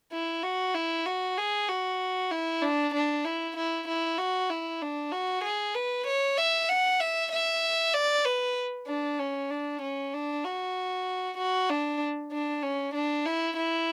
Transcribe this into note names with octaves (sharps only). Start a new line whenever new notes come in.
E4
F#4
E4
F#4
G#4
F#4
E4
D4
D4
E4
E4
E4
F#4
E4
D4
F#4
G#4
B4
C#5
E5
F#5
E5
E5
D5
B4
D4
C#4
D4
C#4
D4
F#4
F#4
D4
D4
C#4
D4
E4
E4